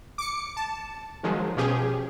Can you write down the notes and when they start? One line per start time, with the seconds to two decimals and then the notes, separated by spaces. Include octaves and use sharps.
0.18 D6 C#7
0.57 A5
1.23 D#3 F3 F#3 G#3
1.56 B2 F3 C#4 G4 G#4